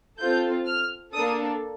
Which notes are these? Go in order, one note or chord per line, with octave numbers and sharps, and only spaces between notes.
C4 F4 A4 G6
F6
A#3 D4 A4 D#6